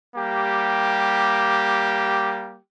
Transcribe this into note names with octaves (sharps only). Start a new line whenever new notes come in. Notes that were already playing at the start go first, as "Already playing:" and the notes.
G3 A#3 G4